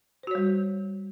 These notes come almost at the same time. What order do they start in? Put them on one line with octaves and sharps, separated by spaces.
C5 F#4 C#5 G3